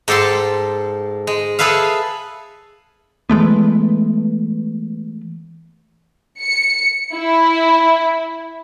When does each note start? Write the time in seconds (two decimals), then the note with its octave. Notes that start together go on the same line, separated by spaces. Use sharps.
0.08 G#2 G4 A4 A5 C6
1.27 G#3
1.59 G#4 A4 B4 E5 F5
3.30 E3 G#3 A3 B3
6.41 C#7
7.14 E4